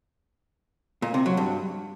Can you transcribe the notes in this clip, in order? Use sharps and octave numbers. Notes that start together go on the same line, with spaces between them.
A#2
C3
F#3
G2